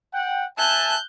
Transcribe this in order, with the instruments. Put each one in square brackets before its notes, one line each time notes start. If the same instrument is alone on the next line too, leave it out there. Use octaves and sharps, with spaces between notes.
[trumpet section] F#5 G5
[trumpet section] E5 G#5 A5 [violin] F#6 G6